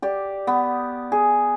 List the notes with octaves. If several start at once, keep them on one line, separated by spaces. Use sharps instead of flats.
G4 D5
B3
G#4